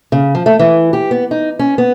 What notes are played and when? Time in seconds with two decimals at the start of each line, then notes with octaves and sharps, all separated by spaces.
0.12 C#3
0.35 F3
0.46 A3
0.59 E3
0.93 G4
1.11 B3
1.31 D#4
1.59 C#4
1.78 B3